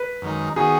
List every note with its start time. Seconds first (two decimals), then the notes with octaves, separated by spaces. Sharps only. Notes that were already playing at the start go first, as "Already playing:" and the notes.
Already playing: B4
0.22 F#2 D#3 G#3 D#4
0.56 D#3 B3 D#4 F#4 G#4